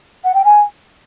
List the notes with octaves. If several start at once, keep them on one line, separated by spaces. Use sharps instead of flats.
F#5
G5
G#5